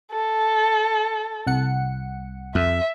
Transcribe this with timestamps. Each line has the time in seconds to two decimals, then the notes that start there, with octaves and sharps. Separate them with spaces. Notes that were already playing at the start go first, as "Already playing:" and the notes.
0.12 A4
1.47 C2 F#5 C#7
2.55 F2 E5